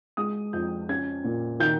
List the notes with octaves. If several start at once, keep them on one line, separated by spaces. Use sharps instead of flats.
G#3 D#6
F2 G6
C#4 G#6
A#2
D#3 G6